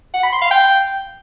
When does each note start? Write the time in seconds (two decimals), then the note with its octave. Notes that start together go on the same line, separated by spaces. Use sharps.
0.14 F#5
0.23 B5
0.32 C6
0.42 F5
0.51 G5